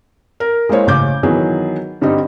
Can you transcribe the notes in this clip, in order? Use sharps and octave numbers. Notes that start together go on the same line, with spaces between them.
A#4
G#3 A#3 E4 C5 C#5
A1 C#3 D6 G6
D#3 E3 F#3 B3 G#4
G2 D3 G3 C4 D#4